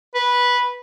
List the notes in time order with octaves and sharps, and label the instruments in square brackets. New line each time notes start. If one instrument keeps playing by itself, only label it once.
[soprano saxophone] B4